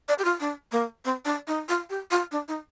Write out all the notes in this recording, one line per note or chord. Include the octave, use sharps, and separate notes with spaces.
D5
G4
F4
D4
A#3
C4
D4
D#4
F4
G4
F4
D4
D#4